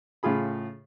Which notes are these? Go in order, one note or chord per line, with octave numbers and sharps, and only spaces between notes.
A2 C#3 F4 G#4 B5